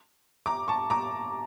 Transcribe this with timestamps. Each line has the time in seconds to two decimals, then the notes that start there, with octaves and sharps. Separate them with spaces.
0.46 A#5 D6
0.68 A5 C#6
0.90 A#5 D6